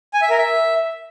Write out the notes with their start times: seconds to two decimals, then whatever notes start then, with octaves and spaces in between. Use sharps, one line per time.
0.14 G#5
0.22 E5
0.30 A#4
0.38 E5